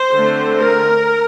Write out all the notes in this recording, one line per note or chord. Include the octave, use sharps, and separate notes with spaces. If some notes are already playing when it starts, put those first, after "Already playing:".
Already playing: C5
D3 A3 C4
A#4